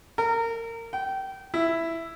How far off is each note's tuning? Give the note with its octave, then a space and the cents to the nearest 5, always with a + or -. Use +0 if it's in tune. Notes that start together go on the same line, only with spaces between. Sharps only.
A#4 -25
G5 -25
E4 +5